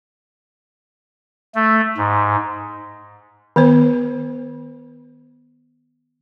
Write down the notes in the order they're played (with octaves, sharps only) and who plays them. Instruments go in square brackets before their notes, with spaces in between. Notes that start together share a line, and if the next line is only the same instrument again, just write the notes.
[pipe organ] A3
G#2
[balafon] D#3 B3 C5